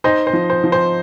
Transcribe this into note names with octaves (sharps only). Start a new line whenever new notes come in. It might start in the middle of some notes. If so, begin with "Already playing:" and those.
D#4 C5 D#5
C5
F3
C5
F3
C5